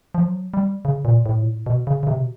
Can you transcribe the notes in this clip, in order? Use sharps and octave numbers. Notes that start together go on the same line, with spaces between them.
F3
F#3
G3
C#3
A#2
A2
A#2
A2
B2
C#3
C#3
C3
B2